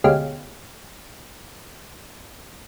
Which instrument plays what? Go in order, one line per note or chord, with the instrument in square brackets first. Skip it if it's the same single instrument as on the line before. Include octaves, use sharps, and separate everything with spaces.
[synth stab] D2 B2 G#3 C#4 G4 F5